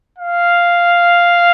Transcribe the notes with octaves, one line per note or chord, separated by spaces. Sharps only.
F5